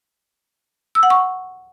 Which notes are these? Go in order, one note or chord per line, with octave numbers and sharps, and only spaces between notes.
E6
F#5
C#6